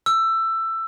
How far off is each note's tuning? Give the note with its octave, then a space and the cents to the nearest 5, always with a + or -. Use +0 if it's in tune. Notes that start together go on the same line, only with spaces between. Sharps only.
E6 +15